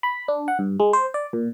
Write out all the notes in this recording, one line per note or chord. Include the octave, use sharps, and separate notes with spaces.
B5
D4
F#5
G2
G#3
C5
D5
A#2